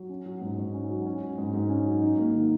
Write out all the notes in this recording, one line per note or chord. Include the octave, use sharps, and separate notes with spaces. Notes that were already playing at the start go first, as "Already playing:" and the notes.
Already playing: F#3
C#4
F#3
G#2
G#2
C#4
F#3
C#4
F#3
G#2
G#2
C#4
F#3
D#4
A#3
D#3